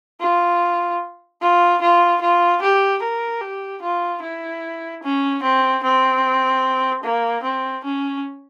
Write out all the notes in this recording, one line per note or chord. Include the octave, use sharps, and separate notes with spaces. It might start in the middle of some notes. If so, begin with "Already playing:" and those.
F4
F4
F4
F4
G4
A#4
G4
F4
E4
C#4
C4
C4
A#3
C4
C#4